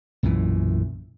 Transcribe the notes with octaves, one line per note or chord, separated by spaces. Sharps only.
B1 F#2 A#2 E3